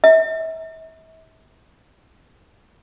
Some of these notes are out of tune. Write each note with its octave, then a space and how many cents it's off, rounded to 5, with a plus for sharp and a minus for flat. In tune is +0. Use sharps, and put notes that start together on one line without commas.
E5 -35